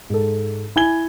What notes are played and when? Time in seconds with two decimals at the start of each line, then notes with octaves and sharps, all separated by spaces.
0.10 G#2 A4
0.76 E4 G#5 G#6 G7